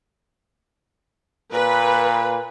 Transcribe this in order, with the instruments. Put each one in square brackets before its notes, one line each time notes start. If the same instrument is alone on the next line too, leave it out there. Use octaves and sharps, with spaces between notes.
[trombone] A#2 [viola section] B4